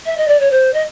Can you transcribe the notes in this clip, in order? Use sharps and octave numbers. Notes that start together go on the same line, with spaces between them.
E5
D#5
D5
C#5
C5
D#5